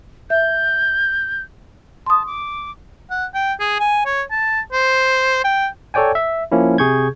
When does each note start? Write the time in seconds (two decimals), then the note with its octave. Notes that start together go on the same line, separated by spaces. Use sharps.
0.30 E5 G6
2.06 A5 C6 D#6
2.26 D6
3.11 F#5
3.35 G5
3.60 G#4
3.80 G#5
4.06 C#5
4.31 A5
4.73 C5
5.44 G5
5.94 A4 C#5 D5 G5 G#5
6.15 E5
6.52 F3 A#3 C#4 E4
6.78 C3 G#4 C#6 G6 G#6